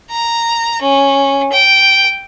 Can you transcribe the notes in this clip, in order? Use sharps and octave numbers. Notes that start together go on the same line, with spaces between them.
A#5
C#4
G5